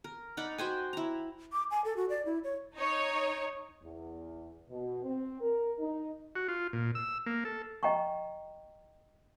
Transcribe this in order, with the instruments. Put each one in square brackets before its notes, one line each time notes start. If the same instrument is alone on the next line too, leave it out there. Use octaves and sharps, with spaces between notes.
[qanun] A#4
D#4 D5 F#5 B5
F#4 C5 G5 G#5
E4 A#5
[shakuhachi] D6
G#5
A4
F#4
D5
E4
C#5
[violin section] D#4 C#5
[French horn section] E2
B2
C4
A#4
D#4
[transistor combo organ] F#4
F4
A#2
E6
A#3
A4
[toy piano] D#5 G5 A#5 C#6